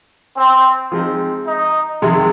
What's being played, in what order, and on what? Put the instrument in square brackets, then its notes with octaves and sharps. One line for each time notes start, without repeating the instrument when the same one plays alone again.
[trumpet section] C4
[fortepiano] F3 G#3 C4 D#4
[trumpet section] D#4
[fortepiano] F2 C3 D#3 G#3